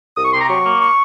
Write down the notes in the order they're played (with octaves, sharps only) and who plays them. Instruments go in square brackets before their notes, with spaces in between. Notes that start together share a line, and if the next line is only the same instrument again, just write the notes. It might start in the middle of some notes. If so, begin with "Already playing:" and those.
[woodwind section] C2 D#6
C#6
C3 C6
A#5
F#3 C#6
A#3
C#6